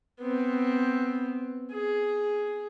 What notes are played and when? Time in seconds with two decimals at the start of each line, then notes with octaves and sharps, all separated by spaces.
0.20 B3 C4
1.72 G#4